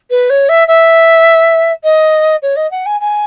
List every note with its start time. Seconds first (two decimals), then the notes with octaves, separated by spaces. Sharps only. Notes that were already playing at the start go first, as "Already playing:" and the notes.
0.10 B4
0.29 C#5
0.49 E5
0.67 E5
1.83 D#5
2.42 C#5
2.56 D#5
2.71 F#5
2.85 G#5
3.00 G#5